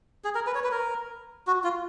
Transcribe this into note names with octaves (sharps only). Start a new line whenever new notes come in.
G#4
A#4
B4
C#5
B4
A#4
F#4
F4